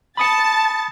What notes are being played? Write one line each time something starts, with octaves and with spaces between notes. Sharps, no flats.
A5 B5 D#6 A6 C#7